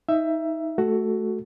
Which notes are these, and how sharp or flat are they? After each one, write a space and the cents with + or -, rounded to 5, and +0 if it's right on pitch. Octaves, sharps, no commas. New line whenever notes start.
D#4 +25 E5 +15
A3 -15 F#4 +10 A4 +0